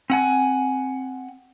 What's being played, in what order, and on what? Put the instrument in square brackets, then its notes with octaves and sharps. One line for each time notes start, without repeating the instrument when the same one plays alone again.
[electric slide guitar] C4 F#5 G#5